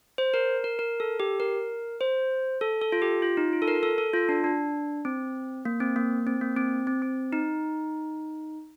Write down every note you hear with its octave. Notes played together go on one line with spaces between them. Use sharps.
C5
A#4
A#4
A#4
A4
G4
A#4
C5
A4
A4
F4
G4
F4
D#4
F4
A4
A#4
A4
A4
F4
D4
D4
C4
A#3
C4
A#3
C4
A#3
C4
C4
C4
D#4